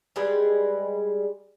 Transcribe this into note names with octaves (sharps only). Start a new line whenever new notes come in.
G3 G#3 G#4 B4